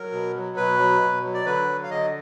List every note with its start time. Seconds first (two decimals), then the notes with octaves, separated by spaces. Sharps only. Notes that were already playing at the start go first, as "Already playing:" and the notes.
Already playing: F#3 A#4
0.12 B2
0.35 F#3
0.57 B2 B4
0.79 F#3
1.01 B2
1.23 F#3
1.34 D5
1.46 D3 B4
1.68 F#3
1.83 F5
1.90 D3 D#5